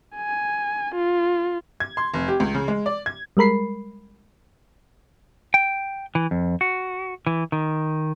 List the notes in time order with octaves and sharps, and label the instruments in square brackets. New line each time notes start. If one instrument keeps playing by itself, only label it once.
[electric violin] G#5
F4
[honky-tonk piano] G#6
C6
F1
G4
C#2
C#3
G#3
D5
G#6
[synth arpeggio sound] G3 G#3 A#4 B5 C7
[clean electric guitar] G5
E3
F2
F#4
E3
D#3